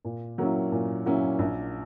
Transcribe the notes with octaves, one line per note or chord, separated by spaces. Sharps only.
A#2
F#3 A#3 C#4 E4
A#2
F#3 A#3 C#4 E4
A#1